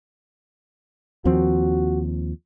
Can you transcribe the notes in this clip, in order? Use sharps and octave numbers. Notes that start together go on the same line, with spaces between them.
D#2 F3 C4 F#4